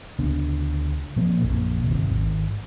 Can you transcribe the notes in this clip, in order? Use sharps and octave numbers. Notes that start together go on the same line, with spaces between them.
D2 C#3 B3 D4
A#2 F3 A#3 C4
A#1 F#2 A#2
G1 D#2 C3
G#1